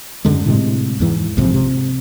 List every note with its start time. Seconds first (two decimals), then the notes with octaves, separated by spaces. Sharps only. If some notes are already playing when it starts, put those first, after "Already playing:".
0.25 F#2 D3 G#3
0.46 A2 C3 G#3
1.00 E2 G#2 E3
1.37 A#1 G#2 C3 F3
1.54 C3